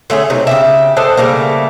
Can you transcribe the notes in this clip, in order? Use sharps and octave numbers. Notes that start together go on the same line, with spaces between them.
D3 A3 C#4 G#4
C3 F#3 C4 D#4
C#3 G4 E5
D4 A4 C5 D#5
C#3 G3 A3 A#3